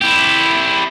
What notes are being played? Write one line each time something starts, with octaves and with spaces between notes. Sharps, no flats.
E4 G4